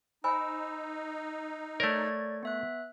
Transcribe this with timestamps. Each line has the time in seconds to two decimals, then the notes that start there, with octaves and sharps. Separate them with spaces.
0.24 D#4 C5 G#5 B5 E6
1.80 A3 A#4 C#5 D5 G#6
2.43 B3 E5 F#6